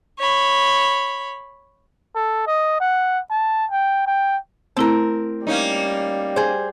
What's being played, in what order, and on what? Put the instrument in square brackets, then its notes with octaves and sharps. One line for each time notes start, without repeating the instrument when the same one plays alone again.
[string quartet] C#5 B5
[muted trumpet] A4
D#5
F#5
A5
G5
G5
[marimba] A3 E4 [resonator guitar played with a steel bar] C4 A#4
[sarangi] G3 [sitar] A#3 C#4 D#4
[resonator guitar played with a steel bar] G#4 C5